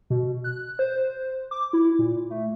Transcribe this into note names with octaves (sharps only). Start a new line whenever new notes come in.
B2
F#6
C5
D6
E4
A#2
A3